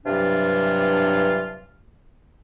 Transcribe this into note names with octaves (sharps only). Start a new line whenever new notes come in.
G2 C3 E3 F#3 D4 F4